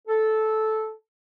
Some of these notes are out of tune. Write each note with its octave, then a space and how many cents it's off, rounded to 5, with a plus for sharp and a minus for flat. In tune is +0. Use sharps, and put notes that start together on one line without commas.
A4 -10